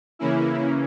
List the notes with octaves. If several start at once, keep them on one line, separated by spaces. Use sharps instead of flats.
C#3 E3 A#3 C#4 E4